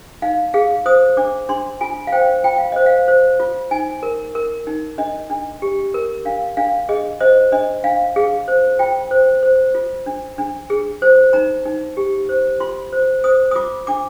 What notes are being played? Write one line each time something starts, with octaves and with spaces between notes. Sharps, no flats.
D#4 F5
G#4 F5
C5 D#6
D4 D6
D4 C6
F4 G#5
F5
C5 G5
F4 G5
F5
C5 D#5
F5
C5
F4
D#4 G#5
A#4
A#4
D#4
D4 D#5
D4
G4
A#4
D4 F5
D4 F5
G#4 D#5
C5 D#5
D4 D#5
D4 F5
G#4 F5
C5
F4 G5
C5
C5
F4
D4
D4
G#4
C5
D#4 A#5
D#4
G4
C5
F4 C6
C5
C5 D#6
D#6
F4 D6
D4 D6